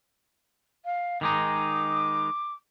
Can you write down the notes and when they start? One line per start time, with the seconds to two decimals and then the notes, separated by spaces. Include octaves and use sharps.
0.84 F5
1.21 D#3 G#3 D#4 D6